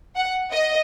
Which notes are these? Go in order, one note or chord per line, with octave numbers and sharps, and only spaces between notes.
F#5
D#5